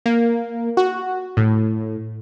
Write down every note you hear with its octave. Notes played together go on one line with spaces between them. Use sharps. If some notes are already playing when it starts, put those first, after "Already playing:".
A#3
F#4
A2